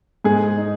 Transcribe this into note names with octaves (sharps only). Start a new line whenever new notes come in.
G#2 G#4
D#4